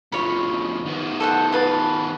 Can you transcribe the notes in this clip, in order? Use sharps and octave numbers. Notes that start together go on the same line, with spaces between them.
D2 F3 C#5 B5
D#3 B3
A4 C5 F#5
F4 B4 A5